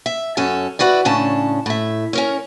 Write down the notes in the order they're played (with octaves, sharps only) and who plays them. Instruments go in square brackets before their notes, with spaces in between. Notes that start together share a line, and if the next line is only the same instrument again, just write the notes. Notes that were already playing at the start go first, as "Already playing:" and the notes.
[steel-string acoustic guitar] E5
F#2 C#4 A4 A5
E4 F#4 B4 D5
A2 C#3 C#4 D4 A5
A2 E5
C#4 A#4 C#5